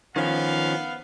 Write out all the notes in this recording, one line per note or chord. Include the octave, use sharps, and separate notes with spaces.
D#3 F3 B3 C#4 F5